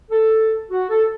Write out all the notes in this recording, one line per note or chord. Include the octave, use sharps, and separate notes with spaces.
A4
F#4
A4